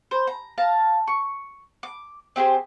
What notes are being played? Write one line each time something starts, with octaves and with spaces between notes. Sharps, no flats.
C5
A#5
F5 A5 A#5
C#6
D6
C4 G4 G#4 C5